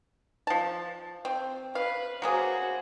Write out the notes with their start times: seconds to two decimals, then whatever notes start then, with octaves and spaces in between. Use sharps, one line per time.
0.47 F3 A5
1.25 C4
1.75 B4 F5
2.22 F#3 A#3 F#4 G#4 C5